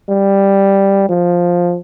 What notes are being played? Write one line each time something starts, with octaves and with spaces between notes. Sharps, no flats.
G3
F3